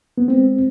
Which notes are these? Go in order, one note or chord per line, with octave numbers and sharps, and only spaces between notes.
B3
G#3 C4